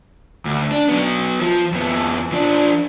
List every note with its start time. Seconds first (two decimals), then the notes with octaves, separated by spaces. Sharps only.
0.45 D2
0.71 D4
0.89 F#3 B3
1.41 F3
1.72 F2 B3
2.32 F3 D4